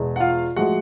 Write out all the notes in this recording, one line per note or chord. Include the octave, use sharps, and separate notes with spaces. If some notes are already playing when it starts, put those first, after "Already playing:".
Already playing: E2 B2 G#3
F#5
F4 F5
A2 F3 G#3 F#4 F#5